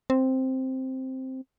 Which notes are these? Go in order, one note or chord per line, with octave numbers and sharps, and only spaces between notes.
C4